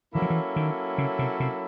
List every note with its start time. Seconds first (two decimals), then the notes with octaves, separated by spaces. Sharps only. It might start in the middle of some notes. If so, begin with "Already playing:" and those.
0.14 E3 F#3 A#3 C#4 E4 A4
0.22 F3
0.30 E3
0.56 D#3
0.98 C#3
1.19 C3
1.40 C3